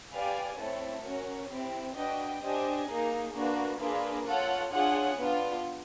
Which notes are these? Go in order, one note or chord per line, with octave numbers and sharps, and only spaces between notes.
G4 B4 D5 F5 G#5
A3 C4 E4 A4 C#5
C#4 F#4 A#4 C#5
C4 E4 G4
D4 F#4 B4 D#5 G5
D4 G4 C5 D#5 G#5
A#3 D#4 G#4
A#3 D4 F#4 B4
A#3 D4 F4 G#4 B4
F4 A4 C#5 F#5
D4 F4 G#4 C#5 F#5
B3 D4 F4